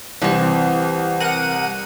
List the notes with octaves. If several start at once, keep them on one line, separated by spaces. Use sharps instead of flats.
C2 E3 C4
A#4 F#5 D#7